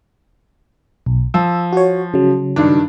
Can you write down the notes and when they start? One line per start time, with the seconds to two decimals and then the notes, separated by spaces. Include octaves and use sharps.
1.06 B1
1.34 F3 E6
1.73 F#4 C#5
2.14 C#3 F#3
2.56 G2 D#3 D4